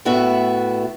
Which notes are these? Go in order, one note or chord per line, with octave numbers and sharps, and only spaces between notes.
A2 A3 B3 F#4 E5